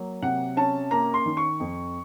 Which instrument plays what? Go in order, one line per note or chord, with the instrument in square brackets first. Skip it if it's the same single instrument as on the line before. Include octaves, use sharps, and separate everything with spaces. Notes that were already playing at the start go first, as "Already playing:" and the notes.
Already playing: [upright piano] F#3 A#3
C3 F#5
C#4 A5
A#3 A#5
C6
D#3
C#6
F2